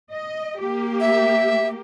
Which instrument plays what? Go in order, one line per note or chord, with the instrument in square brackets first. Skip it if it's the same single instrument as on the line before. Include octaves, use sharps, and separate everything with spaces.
[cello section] D#5
A#3 G4
[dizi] E5